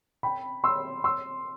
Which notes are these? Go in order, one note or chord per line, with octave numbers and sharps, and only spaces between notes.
G5 B5
C6 E6
C6 E6